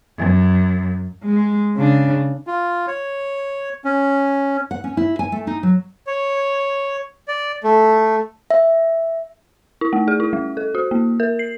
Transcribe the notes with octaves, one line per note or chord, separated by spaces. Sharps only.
F#2
G#3
C#3 D4
F4
C#5
C#4
F#5
C#4
E4
G#5
A3
D#4
F#3
C#5
D5
A3
E5
E4
A3
G#4
E4
G3
A4
F#4
A#3
A#4
C7